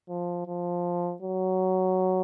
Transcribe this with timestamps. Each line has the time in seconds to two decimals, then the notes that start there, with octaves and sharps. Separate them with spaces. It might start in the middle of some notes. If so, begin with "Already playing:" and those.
0.09 F3
0.47 F3
1.22 F#3